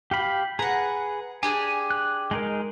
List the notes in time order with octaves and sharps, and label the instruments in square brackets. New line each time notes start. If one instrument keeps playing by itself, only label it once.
[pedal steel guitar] G4 F5 B5
[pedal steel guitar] G#4 B4 [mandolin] F#5 A#5
[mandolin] D4 G4 G#4 [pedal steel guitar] G#5
[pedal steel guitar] F#6
G#3 D#4 A#4